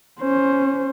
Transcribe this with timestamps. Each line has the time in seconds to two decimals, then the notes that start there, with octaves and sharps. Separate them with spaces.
0.21 C#4 C5